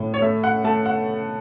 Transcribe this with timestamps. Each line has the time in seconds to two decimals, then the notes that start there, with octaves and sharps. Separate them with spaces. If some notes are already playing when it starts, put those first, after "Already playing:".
Already playing: A2
0.14 C#5
0.22 A3 E5
0.44 F#5
0.64 A3 A5
0.86 F#5